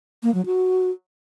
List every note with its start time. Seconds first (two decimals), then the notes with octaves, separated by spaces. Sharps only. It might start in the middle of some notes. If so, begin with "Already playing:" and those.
0.23 A#3
0.34 F#3
0.46 F#4